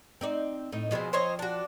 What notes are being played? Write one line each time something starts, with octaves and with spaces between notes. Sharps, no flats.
C4 D#4 D5
A2 D#4
B2 F3 G#3 C4 E4
C5 C#5 D#5
D4 F#4